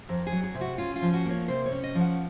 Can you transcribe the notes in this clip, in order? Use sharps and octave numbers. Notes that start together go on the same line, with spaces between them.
F2 A#4
G#4
F#3
G#4
C3
F#4
C#4 F4
F4
F3
F#4
A#3 C#5
C3 C5
C#5
C#4
D#5
F3
F#5